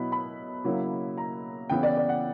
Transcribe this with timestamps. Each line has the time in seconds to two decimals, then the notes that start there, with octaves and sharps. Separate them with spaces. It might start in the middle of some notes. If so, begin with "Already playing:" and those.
Already playing: B2 F#3 B3 E4 B5
0.12 B5
0.65 C#3 F#3 A#3 E4
1.17 A#5
1.70 C#3 E3 B3 E4 G5
1.83 D5
1.97 D5
2.09 F#5